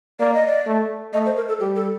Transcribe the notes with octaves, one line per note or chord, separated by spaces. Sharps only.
A#3 D5
D#5
D5
A3
A3 D#5
C5
A#4
A4
G3 G4
A4